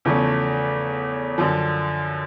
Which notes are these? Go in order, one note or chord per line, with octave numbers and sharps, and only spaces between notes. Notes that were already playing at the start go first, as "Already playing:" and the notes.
E2 C#3 F3 A3 C#4
F#2 D3 F3